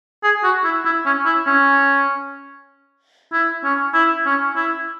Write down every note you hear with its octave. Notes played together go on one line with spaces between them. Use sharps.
G#4
F#4
E4
E4
C#4
E4
C#4
E4
C#4
E4
C#4
E4